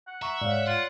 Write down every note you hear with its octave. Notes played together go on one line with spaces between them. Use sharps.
F#5
E5 A#5 C#6
G#2 C#5 D5 F5
F4 F#5